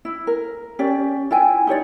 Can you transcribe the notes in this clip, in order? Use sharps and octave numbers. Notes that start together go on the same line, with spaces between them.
E4
A#4
C#4 G4 D5
E4 F4 G5 G#5
D#4 G4 C#5 D5